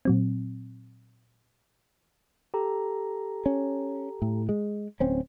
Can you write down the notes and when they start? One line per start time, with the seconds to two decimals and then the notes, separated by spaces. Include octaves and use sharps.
0.05 A#2 F#3 C4
2.54 G4 A4 A#5
3.46 C#4
4.22 A2
4.49 G#3
5.00 D1 C4 C#4